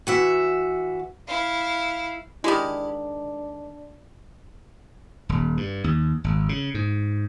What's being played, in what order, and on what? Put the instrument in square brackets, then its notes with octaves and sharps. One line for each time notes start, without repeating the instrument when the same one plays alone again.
[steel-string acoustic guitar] E3 F#4 E5
[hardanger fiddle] E4 F5
[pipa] D#3 G#3 [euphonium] D4 [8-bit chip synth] E4 G4 B5
[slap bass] D#1
G2
D#2
G#1
C#3
G#2